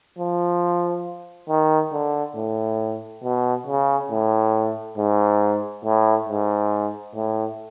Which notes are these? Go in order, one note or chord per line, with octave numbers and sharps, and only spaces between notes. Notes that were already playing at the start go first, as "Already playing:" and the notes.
F3
D#3
D3
A2
B2
C#3
A2
G#2
A2
G#2
A2